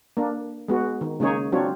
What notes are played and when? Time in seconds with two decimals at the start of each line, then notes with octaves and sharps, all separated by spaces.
0.17 A#3 D4
0.68 G#3 B3 F#4
1.01 D#3
1.20 C#3 G#3 A#3 D#4 G#4 C#5
1.52 F#3 C4 D4 F4 C#5